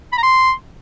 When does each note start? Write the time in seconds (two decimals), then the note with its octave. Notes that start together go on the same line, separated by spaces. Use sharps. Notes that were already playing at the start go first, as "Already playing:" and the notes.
0.13 B5
0.18 A#5
0.23 C6